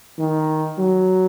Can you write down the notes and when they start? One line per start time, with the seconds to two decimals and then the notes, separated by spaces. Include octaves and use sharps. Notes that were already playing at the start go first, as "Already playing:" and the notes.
0.19 D#3
0.79 F#3